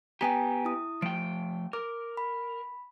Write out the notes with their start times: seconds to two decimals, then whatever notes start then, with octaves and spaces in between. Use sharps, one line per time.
0.21 B3 G4 G5 G#5 A#5
0.65 E4 D#6
1.02 F3 A3 G5 D7
1.73 A#4 D6
2.17 B5